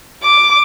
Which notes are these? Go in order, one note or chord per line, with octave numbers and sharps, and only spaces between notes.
D6